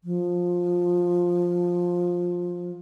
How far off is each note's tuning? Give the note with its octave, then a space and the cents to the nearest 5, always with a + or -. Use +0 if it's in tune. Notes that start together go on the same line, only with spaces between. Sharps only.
F3 +15